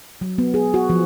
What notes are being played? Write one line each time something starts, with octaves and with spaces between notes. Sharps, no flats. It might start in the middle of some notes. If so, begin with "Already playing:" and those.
F#3
B3
G#4
F#4
F3